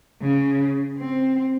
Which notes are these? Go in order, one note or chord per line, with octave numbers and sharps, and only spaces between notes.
C#3
C4